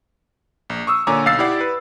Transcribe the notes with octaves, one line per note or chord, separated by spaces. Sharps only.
A#1
C#6 D#6 E6
A#2 D3 C#5 G#5 A#5 D6
B1 F5 E6 A6 C7
E4 G4 D5 F#5
B4